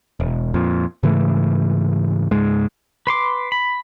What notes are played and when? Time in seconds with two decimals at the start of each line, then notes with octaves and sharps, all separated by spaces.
0.20 E1
0.54 F2 A#2
1.03 G#2 C#3 E3 A3
2.31 C#2 G#2 G#3
3.07 B4 C6 D6
3.52 B5